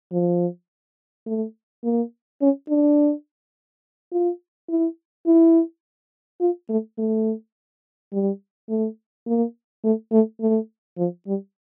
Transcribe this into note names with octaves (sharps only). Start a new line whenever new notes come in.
F3
A3
A#3
C#4
D4
F4
E4
E4
F4
A3
A3
G3
A3
A#3
A3
A3
A3
F3
G3